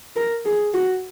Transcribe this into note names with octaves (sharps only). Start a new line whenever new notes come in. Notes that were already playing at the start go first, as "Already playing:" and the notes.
A#4
G#4
F#4